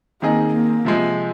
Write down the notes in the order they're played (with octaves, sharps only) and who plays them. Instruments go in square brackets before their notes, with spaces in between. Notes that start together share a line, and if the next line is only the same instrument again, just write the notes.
[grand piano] D#3 C4 D#4 G#4 D#5 [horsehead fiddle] A#3
[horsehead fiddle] A#3
[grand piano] C3 F3 G#3 C4